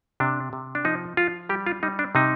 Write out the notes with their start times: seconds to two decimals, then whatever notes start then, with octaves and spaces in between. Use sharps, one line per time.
0.20 C3 D4
0.53 C3
0.75 D4
0.85 F3 D#4
1.17 F3 F4
1.49 G3 G4
1.66 F4
1.83 G3 D#4
1.99 D4
2.15 C3 D#4